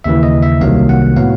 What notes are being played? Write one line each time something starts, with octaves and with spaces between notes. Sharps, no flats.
D#2 C#3 E3 E5
D#5
E5
C2 C3 D#3 F#3 A#3 F5
F#5
A2 F#3 B3 F5